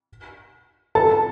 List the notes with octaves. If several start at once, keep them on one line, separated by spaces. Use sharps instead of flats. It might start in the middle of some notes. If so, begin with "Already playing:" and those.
A4 A5